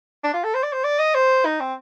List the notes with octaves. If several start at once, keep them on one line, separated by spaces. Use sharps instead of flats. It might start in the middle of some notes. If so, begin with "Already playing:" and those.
D4
F4
A4
C5
D5
C5
D5
D#5
C5
D#4
C4